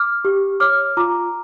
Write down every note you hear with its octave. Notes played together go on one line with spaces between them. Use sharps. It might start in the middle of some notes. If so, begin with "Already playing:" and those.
Already playing: D6 F6
G4
C#5 D6 F6
F4 A#5 D6